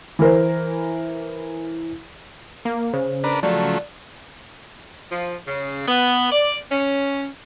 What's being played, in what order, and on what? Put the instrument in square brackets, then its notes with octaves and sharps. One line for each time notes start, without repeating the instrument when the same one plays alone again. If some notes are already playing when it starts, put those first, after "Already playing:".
[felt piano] E3 E4 A#4 C5
[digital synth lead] A#3
[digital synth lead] C#3 [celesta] C5
[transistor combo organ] D4 A#4 B4
[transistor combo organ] F3 F#3 A3 [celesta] D5
[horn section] F3
C#3
B3
D5
C#4